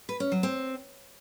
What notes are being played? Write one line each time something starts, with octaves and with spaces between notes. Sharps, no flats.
B4
C#4
F#3
C4